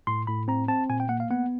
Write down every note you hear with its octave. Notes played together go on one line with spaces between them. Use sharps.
A2 C6
A2 B5
C4 A#5
C4 A5
A#2 G#5
G5
A#3 F#5
F5
B3 F#5